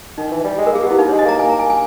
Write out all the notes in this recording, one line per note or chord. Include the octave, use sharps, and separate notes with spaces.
D#3 D#4
E3
G3
G#3
A#4
A#3 G#4
B3 G4
E4
A#3 D#4
C#5
G#3
D#5
A#3 A#5
A#3 G#5
A#5
G#5
G#5